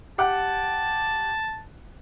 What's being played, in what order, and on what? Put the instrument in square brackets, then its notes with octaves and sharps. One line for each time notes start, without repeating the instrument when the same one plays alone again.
[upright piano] G4 F#5 D6 [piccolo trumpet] A5